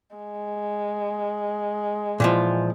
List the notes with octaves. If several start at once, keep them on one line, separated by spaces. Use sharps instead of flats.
G#3
A#2 E3 F3